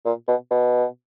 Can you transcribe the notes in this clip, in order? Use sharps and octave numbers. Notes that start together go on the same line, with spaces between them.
A#2
B2
B2